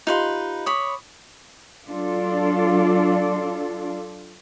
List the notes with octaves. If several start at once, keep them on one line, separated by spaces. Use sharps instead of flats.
D#4 F4 G4 B4 F5 C6
C#5 B5 D6 D#6
F#3 D4 F4 A4 D5